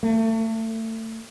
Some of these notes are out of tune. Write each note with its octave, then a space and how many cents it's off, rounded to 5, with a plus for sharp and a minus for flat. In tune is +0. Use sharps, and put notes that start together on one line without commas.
A3 +30